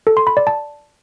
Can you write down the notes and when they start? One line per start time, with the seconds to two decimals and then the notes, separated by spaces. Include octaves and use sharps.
0.07 A4
0.17 C6
0.27 B5
0.37 D5
0.47 A5